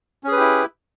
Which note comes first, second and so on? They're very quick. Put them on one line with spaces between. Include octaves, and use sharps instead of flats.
C#4 G#4 B4 G4 E4